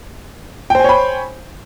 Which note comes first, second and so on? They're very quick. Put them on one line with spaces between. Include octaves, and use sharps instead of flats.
G5 C5 G#5 C#5 B5